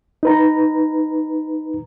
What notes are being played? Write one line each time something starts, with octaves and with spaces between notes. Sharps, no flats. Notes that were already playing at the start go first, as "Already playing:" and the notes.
D#4 B4 A#5